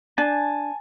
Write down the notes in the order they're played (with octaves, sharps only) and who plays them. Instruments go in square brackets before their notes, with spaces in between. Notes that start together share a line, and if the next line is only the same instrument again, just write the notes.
[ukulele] D4 [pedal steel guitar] G#5 A5